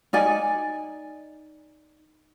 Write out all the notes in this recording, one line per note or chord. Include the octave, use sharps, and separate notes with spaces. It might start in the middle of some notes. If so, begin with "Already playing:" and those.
D#4 D5 G#5